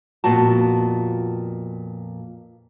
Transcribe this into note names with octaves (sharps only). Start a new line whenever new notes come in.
F2 A#2 B3 F#4 A5